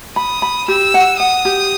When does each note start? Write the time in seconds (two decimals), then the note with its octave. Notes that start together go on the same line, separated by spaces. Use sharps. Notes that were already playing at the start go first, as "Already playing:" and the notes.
0.16 B5 D#6
0.42 B5
0.68 G4 E6
0.94 F#5
1.19 F#5 D#6
1.45 G4